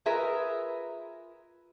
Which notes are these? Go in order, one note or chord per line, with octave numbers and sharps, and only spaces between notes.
F4 G#4 A#4 B4 E5